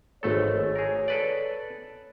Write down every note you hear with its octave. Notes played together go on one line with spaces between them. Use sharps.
G#1 A3 A4 C#5
G#4 A#4
A4 B4 D5